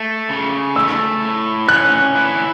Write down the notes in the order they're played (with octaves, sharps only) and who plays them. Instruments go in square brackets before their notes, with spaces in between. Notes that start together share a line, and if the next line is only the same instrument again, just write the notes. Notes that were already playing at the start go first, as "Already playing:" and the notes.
Already playing: [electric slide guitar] A3
C#3
[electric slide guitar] A3 [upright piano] E6
[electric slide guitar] A2
[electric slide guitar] C#4 [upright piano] F#6
[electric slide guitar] E4